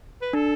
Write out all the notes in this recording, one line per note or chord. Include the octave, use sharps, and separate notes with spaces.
B4
D4 A4